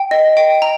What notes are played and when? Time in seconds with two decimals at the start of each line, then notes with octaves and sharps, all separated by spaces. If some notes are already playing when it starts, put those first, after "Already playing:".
Already playing: G5
0.11 D#5
0.37 G5
0.62 A#5